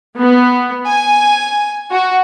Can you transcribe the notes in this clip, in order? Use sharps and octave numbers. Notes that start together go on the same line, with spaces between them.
B3
G#5
F#4